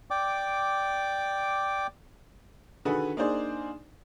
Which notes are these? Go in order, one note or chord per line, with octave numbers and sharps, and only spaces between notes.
D5 G5 D6
D3 D#3 F#4 G#4 A4 B4
A#3 D4 D#4 G#4 C5 D5